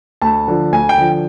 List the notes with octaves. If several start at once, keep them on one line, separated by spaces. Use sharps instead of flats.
D2 A5
D3 F3
D2 G#5
G5
D3 F3